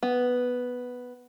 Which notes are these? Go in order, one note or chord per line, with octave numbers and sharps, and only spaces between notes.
B3